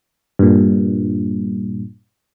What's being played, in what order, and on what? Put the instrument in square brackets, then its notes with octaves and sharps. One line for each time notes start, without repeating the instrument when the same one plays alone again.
[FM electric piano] G2 A#2